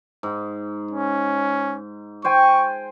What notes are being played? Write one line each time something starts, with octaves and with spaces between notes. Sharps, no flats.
G#2
C#4
C5 G5 G#5 C#6